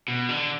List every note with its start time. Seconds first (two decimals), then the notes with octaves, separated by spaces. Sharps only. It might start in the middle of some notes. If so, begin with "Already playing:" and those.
0.08 B2
0.29 D3